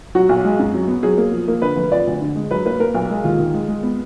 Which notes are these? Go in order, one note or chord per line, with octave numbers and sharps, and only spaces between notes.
F#3 F#4
B1
G#3
F#2
F#3
B3
F#3 G#4
A#3
F3
A#3
D3 B4
F1
F3 D5
D2
D3
G#3
F#3 B4
A#3 B4
A#3 A#4
B1
G#3
D#2 F4
D#3
G#3
G#3
B3